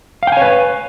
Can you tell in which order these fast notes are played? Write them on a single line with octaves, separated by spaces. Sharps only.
F5 G5 G#5 C#5 B4